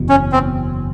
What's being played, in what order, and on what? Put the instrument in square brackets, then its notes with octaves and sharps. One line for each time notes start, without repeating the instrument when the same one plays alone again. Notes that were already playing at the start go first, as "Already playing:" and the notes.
Already playing: [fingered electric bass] F#1 E2 B2
[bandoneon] C#4
C4